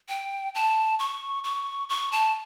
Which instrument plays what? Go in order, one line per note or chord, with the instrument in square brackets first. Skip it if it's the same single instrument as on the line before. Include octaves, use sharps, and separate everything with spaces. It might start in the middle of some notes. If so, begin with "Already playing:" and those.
[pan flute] G5
A5
C#6
C#6
C#6
A5